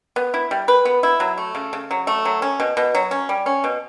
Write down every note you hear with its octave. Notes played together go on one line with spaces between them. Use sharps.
B3
E4
G3
B4
B3
E4
F#3
A3
C#3
C#3
F#3
A3
F#3
C#4
B2
B2
F#3
C#4
G3
C#4
B2